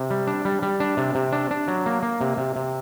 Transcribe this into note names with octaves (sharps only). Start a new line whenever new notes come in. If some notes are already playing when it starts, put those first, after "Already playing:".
Already playing: C3
G3
D4
G3
G3
D4
C3
C3
D4
D4
F#3
A#3
A#3
C3
C3
C3